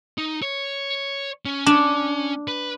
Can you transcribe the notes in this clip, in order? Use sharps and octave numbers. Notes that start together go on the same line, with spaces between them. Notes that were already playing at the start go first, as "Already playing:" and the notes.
D#4
C#5
C#4
D4
B4